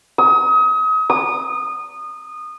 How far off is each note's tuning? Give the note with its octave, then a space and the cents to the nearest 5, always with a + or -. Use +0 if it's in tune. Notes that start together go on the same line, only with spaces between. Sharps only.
D#6 +35
D#6 -25